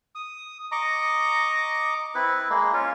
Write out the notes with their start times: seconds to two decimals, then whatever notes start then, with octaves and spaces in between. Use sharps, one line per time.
0.15 D#6
0.72 D#5 A#5 C#6 D6
2.15 C4 E4 B4
2.50 G#3 A#3
2.73 C#4 F4